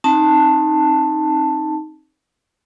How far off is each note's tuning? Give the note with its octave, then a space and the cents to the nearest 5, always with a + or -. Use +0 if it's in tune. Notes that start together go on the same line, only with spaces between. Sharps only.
C4 +35 D#4 +0 A5 +5